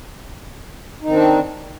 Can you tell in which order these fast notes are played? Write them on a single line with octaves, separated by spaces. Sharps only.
D#4 D#3 C4 D4